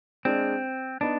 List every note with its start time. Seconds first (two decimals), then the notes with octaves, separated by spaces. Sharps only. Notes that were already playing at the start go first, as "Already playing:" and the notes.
0.25 G#3 C4 D4 G#4 D5
1.01 B3 D4 D#4